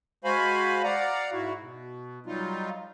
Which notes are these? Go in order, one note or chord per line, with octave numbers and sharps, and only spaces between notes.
G#3 F#4 C5 F5 G#5 B5
D5 F5 F#5 A#5
G#2 E4 F#4
B2
F#3 G3 D#4 F4